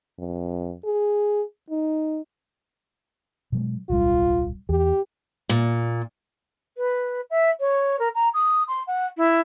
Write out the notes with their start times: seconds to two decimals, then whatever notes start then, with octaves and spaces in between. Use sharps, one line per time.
0.19 F2
0.85 G#4
1.70 D#4
3.52 B2 F#3 G#3
3.90 D1 B1 G3 F4
4.69 E2 G4
5.49 A#2
6.77 B4
7.30 E5
7.60 C#5
7.99 A#4
8.14 A#5
8.33 D#6
8.68 C6
8.87 F#5
9.17 E4